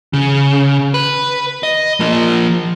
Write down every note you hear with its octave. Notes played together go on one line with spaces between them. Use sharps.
C#3
B4
D#5
F3 A#3